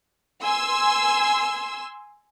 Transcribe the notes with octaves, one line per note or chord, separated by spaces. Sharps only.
G#5 C6 E6